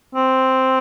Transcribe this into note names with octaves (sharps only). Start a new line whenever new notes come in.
C4